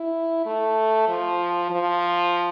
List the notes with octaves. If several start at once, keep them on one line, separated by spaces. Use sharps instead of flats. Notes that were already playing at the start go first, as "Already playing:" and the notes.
Already playing: E4
A3
F3
F3